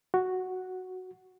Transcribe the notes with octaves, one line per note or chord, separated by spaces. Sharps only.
F#4